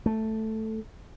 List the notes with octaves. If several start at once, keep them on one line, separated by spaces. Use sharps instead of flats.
A3